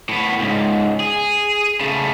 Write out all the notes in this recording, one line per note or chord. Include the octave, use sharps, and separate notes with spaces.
A2 B3
C#2 G#2
G#4
C#3 A3